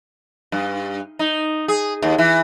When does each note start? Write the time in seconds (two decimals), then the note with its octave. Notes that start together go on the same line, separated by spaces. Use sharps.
0.52 G2
1.19 D#4
1.68 G#4
2.02 D#2
2.18 E3